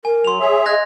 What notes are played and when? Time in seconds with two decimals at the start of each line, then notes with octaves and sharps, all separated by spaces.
0.05 A#4 G#5
0.25 F#3 C6 F7
0.40 G#4 C#5 E5
0.66 D#5 F#6 G#6 A#6